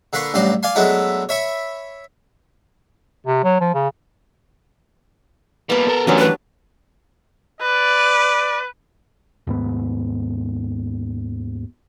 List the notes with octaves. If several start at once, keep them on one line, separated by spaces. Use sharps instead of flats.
D3 A#3 B4 C6 C#6
A1 G2 F#3 D5 C6
D5 F5 G#5 C6
F#3 G#3 A3 B3 D4 E4
C#5 E5 B5 C#6
C3
F#3
F3
C#3
G3 A#3 B3 A5
A4 A#4
F#2 E3 F#3 G3 A3 D4
B4
B4 D5
D#2 G#2 B3